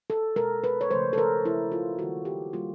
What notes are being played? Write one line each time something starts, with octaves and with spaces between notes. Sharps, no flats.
A4
B2 G#3 A#4
B4
C#5
C#3 F3 A3 C5
A4
A#4
C#3 F3 A3 E4
F4
D#3 G3 A#3 F#4
G4
D#3 G3 A#3 F4